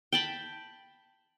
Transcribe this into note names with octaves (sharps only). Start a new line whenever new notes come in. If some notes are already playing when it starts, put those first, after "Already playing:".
G5 A5 B5